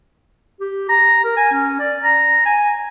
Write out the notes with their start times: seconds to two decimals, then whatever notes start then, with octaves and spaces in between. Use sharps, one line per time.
0.60 G4
0.89 A#5
1.24 A#4
1.37 G#5
1.52 C#4
1.79 D5
2.04 A#5
2.45 G#5